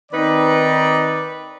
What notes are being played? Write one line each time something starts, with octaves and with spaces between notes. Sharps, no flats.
D#3 C4 D#4 B4 D5